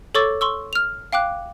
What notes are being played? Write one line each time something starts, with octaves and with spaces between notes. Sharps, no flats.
A4 C#5 C#6 D6 E6 A6
C6 C#6 E6
F6 F7
F5 G5 D6 F#6